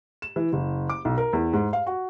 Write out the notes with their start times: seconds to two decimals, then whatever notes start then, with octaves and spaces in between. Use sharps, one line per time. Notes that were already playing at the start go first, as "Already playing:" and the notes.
0.22 E7
0.36 E3
0.53 F#1
0.90 D6
1.05 B1
1.18 A#4
1.33 E2
1.53 G#2
1.73 F5
1.87 F#4